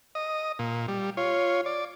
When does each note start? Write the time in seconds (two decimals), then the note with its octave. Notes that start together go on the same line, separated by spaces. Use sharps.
0.15 D#5
0.59 A#2
0.88 G3
1.17 F4 C#5
1.66 D5